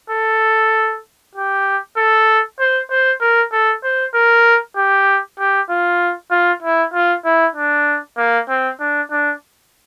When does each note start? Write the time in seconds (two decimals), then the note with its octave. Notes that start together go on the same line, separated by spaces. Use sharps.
0.10 A4
1.35 G4
1.97 A4
2.59 C5
2.91 C5
3.21 A#4
3.52 A4
3.84 C5
4.15 A#4
4.77 G4
5.39 G4
5.70 F4
6.31 F4
6.63 E4
6.93 F4
7.25 E4
7.55 D4
8.17 A#3
8.49 C4
8.80 D4
9.11 D4